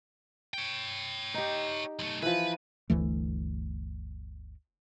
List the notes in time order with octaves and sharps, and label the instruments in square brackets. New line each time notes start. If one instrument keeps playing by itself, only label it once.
[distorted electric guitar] C#5 G5
[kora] D#4 G4
[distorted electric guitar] B1 A3
[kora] E3 F3 [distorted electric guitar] B4
[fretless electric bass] G1 D2 E3 A3